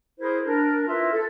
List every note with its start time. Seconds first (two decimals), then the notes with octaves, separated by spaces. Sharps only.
0.20 E4 G#4 A#4 C5
0.45 D4 A#4
0.88 E4 F4 A#4 B4 E5
1.13 A4